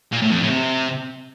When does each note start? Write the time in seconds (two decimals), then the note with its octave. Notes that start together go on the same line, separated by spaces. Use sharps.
0.12 A#2
0.21 A2
0.31 F2
0.41 A2
0.50 C3